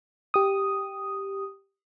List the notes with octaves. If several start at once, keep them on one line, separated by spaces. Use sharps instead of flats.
G4 D#6